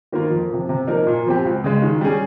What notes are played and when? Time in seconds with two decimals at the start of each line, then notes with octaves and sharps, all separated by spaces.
0.12 D#3 A#3 F4 A#4
0.31 F2
0.51 C3 F3
0.69 C3
0.88 F3 A#3 D#4 A#4
1.07 A#2
1.26 F3 C4 G4
1.45 C#2
1.64 C#3 G#3
1.82 D#3
2.01 G3 C#4 G#4